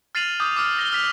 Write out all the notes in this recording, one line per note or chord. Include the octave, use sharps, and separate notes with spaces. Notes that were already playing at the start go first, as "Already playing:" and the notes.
F6 A6 C7 D#7 F7 F#7
D6 D#6 G6
D6 E6 F6
E6 A#6 G7
E6 F6 B6 F7